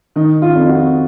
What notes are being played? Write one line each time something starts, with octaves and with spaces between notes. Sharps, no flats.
D#3 D#4
F4
F2
F#4